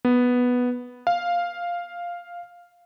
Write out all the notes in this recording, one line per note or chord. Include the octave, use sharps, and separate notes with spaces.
B3
F5